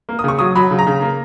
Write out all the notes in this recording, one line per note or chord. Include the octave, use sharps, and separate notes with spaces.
A#3
D#6
C#3 C#6
F#3 D#6
F#3 B5
C#3
A#5
C#3
A#3